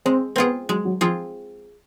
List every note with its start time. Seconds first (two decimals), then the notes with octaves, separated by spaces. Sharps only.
0.05 G#3 C4
0.36 B3 C4 F4 G#4
0.69 F#3 G#3
0.85 F#3
1.01 F3 C4 F4 G#4